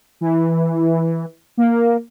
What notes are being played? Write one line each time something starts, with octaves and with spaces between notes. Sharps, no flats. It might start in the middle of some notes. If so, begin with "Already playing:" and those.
E3
A#3